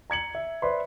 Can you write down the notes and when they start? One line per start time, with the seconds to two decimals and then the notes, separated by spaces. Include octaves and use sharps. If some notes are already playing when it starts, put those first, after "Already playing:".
0.10 A#5 G#6 C#7 F#7
0.35 E5
0.62 B4 C5 D5 E5 B5 C6